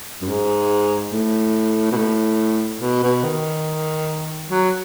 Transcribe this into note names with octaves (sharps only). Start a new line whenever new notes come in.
F#2
G#2
A2
B2
A2
B2
B2
D#3
F#3